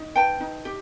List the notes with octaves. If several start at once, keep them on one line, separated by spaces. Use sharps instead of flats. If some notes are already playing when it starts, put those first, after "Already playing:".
Already playing: D#4
B4 G5 A5
D#4
G4